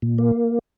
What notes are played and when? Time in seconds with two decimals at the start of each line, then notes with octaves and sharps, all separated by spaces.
0.02 A#2
0.18 A#3